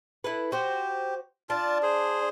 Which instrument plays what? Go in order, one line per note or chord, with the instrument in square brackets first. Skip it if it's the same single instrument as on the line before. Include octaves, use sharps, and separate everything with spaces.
[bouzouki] E4 A4 B4
[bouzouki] F#4 C5 [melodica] G4
[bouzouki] D4 [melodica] F4 A5
[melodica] G#4 C5